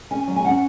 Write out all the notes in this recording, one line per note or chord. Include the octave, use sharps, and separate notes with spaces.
C#4 G#5
F#3
G#5
C#4 F#5